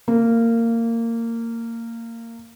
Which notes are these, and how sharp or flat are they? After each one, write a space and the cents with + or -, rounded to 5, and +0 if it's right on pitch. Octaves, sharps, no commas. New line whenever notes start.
A#3 -20